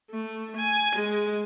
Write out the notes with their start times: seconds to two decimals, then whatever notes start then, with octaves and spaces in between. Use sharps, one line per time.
0.11 A3
0.57 G#5
0.96 G#3